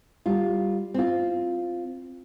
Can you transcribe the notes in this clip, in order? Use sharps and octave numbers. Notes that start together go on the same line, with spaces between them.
G3 F4
C4 F4